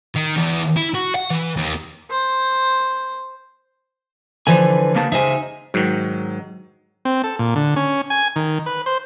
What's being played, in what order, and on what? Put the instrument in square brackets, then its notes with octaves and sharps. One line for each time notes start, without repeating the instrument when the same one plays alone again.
[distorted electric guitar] D#3
E2
E4
F#4
F#5
E3
D#2
[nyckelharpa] C5
[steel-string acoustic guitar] D3 E3 F3 [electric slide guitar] B4 G#5
[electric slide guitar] C#3 A#3 A5
[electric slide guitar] C#3 C5 E5 [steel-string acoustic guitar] D#4 G#5
[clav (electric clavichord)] G#2 D#3 [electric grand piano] F#3
[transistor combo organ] C4
A4
A#2
D3
C#4
G#5
D#3
B4
C5